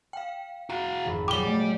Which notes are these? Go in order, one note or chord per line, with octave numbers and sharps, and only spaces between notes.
F5 G5
F#4 F5 A#5 C7
G#1 F2 B5
A#2 F#3 G#3 G4 D5 D6 G7
A3